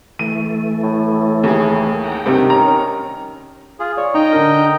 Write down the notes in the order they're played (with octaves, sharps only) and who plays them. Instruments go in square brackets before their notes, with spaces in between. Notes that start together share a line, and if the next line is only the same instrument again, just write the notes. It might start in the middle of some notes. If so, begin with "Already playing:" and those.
[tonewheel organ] E3 A3 [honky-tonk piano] D#7
[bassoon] A2
[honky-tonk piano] D#2 G#4
[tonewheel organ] F#5 G5 A#5
[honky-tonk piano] G2 C3 [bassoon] D#3
[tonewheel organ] C#4 [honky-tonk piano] A#5
[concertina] F4 G#4
[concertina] C#5 [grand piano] D5
[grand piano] D#4 [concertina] D#5 G5 A#5
[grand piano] D3 D4 A#4